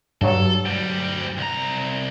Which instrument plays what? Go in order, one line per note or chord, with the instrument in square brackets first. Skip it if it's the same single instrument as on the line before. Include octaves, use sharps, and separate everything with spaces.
[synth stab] G2 F#3 [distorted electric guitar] A4
[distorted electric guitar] D2 G3
C2 A#5